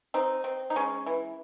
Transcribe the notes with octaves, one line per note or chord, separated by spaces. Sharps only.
C4 D#4
C4
D#4
G#3 C#4
E3